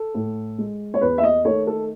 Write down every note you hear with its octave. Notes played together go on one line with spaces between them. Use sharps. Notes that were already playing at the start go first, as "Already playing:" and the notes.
Already playing: A4
A2
G#3
C#5
E2 B4
E5
D#5
D#3 A3 C#5
A4